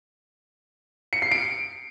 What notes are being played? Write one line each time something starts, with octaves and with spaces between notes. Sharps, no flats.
C#7
C7
D7